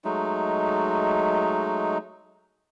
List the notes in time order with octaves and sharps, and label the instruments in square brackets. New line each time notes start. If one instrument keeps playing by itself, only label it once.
[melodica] F#3 G#3 A3 D#4